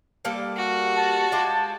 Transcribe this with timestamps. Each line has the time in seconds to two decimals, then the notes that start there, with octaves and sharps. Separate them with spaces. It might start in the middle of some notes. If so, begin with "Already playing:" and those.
0.25 G3 A#3 A4
0.57 F#4
0.95 A5
1.32 G#3 F4 G4